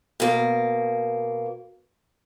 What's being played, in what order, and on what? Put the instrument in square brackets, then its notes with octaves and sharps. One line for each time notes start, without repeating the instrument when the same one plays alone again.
[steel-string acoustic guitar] B2 A#3